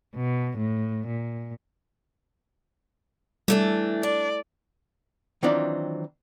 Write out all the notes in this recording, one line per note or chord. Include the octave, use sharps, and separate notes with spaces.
B2
A2
A#2
E3 G3 A3 D4
D4 D5
D#3 E3 F#3 C4 D4 F4